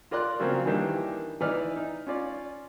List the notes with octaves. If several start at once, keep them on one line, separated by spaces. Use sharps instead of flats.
F4 A#4 D5 C6 F#6
C#3 F3 F#3 A#3 C4
D#3 E3 G3 A#3 D4 G4
E3 D#4 B4 D5 F6
D#4
C#4 F4 D5